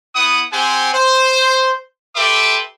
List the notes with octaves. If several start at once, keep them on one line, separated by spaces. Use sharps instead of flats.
B3 E4 F#5 D#6
C4 G4 C5 F#5 G#5
C5
G4 A4 B4 E5 C6 D6